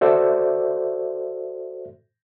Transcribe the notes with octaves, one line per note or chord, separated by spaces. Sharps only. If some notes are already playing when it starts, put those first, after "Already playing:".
F#4 A4 C5 D5 E5